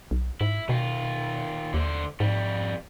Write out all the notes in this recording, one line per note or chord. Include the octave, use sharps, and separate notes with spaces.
B1
G#2 E4
B2 D#3 F4
D#2 D3 C5
F2 G#2 G3